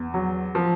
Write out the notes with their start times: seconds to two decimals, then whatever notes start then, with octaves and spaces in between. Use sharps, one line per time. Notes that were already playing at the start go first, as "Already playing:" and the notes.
Already playing: E2
0.14 F#3
0.55 F3